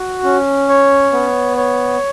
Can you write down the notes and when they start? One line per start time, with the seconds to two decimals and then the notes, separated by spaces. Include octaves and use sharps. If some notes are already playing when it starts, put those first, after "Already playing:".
Already playing: F#4
0.24 C#4
0.69 C#5
1.12 B3
1.57 C#5